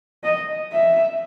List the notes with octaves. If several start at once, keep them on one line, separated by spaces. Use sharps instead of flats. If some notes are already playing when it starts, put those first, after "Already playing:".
D#5
E5